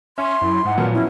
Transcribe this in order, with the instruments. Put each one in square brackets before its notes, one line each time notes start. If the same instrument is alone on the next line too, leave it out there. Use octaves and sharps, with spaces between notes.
[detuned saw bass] C#4 [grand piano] E5 [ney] C6
[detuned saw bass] F#2 [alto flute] E4
[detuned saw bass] G#2 [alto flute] F#5
[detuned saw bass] A#2 [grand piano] F3 F#3 B3 [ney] A#4
[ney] C#4 [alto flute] E4